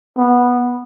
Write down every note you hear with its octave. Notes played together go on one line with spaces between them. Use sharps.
B3